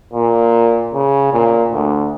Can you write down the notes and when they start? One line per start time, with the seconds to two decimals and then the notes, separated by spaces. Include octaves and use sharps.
0.13 A#2
0.94 C#3
1.33 A#2
1.72 D2